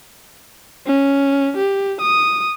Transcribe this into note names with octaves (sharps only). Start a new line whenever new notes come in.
C#4
G4
D#6